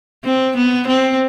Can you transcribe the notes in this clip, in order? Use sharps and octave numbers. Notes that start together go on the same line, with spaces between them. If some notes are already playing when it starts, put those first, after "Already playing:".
C4
B3
C4